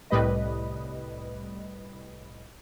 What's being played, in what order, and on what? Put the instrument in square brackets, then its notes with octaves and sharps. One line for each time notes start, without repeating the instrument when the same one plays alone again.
[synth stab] C2 A2 G3 B4 D#5